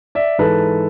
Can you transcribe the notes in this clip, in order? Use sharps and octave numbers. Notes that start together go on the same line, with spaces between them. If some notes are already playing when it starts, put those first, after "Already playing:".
D5 E5
G#2 E3 A4 B4